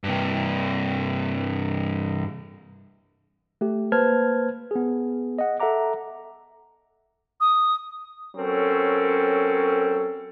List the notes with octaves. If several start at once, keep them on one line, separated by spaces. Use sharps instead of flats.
G2 C3
A3 G4
A#3 B4 C5 A5 F6 G#6
B3 G#4
D#5 F#5
A4 E5 F#5 A#5 D6
D#6
F#3 C4 C#4 A4 A#4